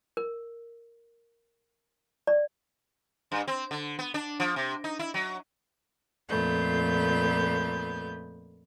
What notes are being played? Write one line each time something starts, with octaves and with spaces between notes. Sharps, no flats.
A#4
D5
G2
C4
D3
B3
D4
F3
C3
D#4
E4
F#3
F2 A#2 A3 B3 G6